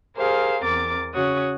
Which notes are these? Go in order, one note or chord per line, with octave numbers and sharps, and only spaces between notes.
G4 G#4 A#4 C5 F5
E2 C4 A#4 D6 A6
C#3 F#4 C#5 D#6